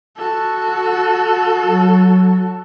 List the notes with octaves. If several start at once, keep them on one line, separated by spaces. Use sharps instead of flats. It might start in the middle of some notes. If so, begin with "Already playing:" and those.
F#4 A4
F#3